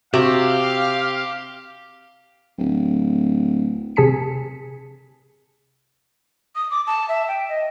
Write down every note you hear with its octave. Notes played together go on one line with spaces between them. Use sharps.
C3 F#4 G4 F5
D1
C3 G#4 G#5 A5 B6 C#7
D#6
D6
A5
E5
G5
D#5